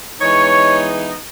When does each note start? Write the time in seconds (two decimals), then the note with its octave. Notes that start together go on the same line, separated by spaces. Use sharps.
0.21 E3 G#3 B3 D#4 C#5